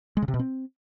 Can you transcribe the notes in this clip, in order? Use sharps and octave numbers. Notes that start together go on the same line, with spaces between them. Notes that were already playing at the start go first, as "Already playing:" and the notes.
G#3
C#3
C3
B2
C4